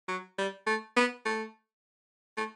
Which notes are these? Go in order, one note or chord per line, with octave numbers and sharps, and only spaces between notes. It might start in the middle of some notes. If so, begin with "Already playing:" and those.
F#3
G3
A3
B3
A3
A3